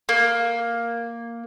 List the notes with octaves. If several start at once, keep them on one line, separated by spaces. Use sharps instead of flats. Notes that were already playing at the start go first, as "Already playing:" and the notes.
A#3